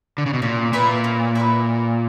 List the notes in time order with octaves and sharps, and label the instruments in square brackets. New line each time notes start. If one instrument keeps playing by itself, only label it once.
[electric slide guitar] D3
C#3
B2
[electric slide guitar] A#2 [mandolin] C#4
[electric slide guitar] A#2 [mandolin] E4 B4 E5
[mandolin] C#4
E4 B4 E5